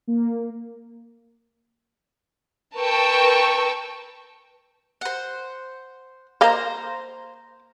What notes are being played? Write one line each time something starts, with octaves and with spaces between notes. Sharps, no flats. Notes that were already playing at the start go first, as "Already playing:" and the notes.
A#3
A#4 B4 G5 A5 C#6 E6
C5 F#5
A#3 C5 D#5 F5 A#5